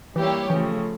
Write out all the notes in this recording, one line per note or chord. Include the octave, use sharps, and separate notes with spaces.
E3 G3 A#3 E4 G4 C#5
C#3 E3 F3 A3